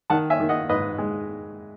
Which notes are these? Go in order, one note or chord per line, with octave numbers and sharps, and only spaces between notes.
D#3 F#5 A5
E5 G#5
D#3
D#5 F#5
G#2 B4 D#5
G#3